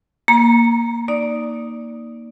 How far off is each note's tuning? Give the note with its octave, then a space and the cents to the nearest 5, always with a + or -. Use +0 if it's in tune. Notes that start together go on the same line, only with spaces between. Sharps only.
A#3 +0 A#5 +35
D#4 +0 D5 +0